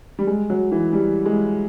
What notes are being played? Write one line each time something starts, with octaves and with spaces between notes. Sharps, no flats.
G3
G#3
F#3
E3
G3
G#3